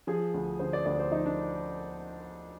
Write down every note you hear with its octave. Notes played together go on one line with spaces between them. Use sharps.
F3 G#4
D2
D3 C5
D5
D2 D5
C5
F3 D#4
D4